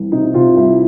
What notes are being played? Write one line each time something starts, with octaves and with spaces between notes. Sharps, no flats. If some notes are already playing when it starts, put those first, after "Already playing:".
Already playing: C2 E3
C3 D#4
C3 F4
C2 E4